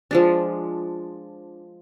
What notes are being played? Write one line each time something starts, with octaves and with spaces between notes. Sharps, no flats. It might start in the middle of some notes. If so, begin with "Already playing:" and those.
F3 G#3 D4